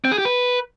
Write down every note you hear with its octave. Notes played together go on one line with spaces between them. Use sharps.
C4
G#4
G4
B4